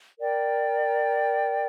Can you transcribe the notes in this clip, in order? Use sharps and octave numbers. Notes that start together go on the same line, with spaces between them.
A#4 D5 G5